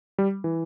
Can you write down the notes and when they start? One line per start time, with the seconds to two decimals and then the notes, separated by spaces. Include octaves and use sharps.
0.18 G3
0.44 E3